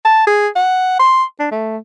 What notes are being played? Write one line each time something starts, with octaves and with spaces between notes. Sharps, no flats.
A5
G#4
F#5
C6
D4
A3